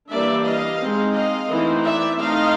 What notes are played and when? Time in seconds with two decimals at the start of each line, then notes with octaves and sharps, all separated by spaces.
0.12 E3 G3 A#3 D4 D5 E5
0.46 D#5 F5
0.81 G#3 C4 D#4
1.16 D#5 F5
1.51 E3 A3 C4 D#4
1.85 D5 E5
2.20 A3 C4 D#4 D#5 F5